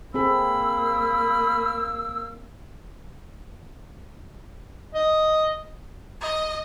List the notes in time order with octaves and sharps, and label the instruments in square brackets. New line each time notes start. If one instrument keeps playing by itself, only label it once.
[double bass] A#3 [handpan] C4 G#4 A4 [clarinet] B5 [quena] E6
[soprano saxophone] D#5
[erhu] D#5